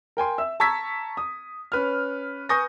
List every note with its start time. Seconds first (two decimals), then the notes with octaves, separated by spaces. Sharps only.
0.17 A#4 G5 G#5 C6
0.38 E5 E6
0.60 A5 A#5 C#6 E6 G#6 B6
1.17 D#6
1.72 C#4 B4 F6
2.49 B4 G#5 C#6 D#6 G6 A#6